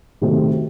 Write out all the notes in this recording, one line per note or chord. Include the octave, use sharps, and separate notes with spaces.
C3 D#3 F#3 A3 C4